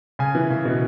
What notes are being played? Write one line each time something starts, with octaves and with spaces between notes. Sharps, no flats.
C#3 G#5
E3
C#3
B2